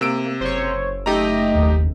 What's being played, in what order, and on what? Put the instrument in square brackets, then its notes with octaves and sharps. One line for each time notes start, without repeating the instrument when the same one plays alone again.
[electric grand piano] C3 E6 D7 [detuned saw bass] A#3
[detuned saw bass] F#1 [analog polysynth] C5 C#5
[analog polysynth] A3 D#5 [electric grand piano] D#4 G4 A#5
[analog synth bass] D#2